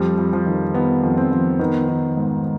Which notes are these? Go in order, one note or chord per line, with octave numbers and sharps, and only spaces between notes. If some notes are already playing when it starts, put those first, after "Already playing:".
Already playing: F2 G3
F2
F3
D#3
D#3 B3
F2
C4
F2
D#3 B3
D#3
G#2